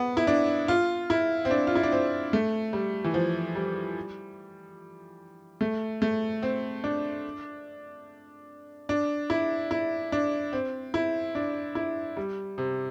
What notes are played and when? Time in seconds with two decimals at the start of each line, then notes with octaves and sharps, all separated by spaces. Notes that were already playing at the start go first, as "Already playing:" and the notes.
Already playing: B3
0.17 E4
0.27 D4
0.68 F4
1.10 E4
1.45 C4
1.51 D4
1.67 F4
1.75 E4
1.83 D4
1.92 C4
2.33 A3
2.73 G3
3.04 E3
3.14 F3
3.55 G3
5.61 A3
6.02 A3
6.43 C4
6.84 D4
8.89 D4
9.30 E4
9.71 E4
10.12 D4
10.53 C4
10.94 E4
11.35 D4
11.75 E4
12.17 G3
12.58 C3